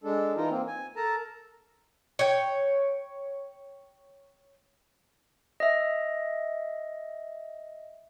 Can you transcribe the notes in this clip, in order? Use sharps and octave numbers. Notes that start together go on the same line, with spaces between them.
G#3 D4 A4
E3 D#4 F4 A#4
A#3 C4
G#5
A4 A#4 A5 A#5
C#5 G5
D#5 E5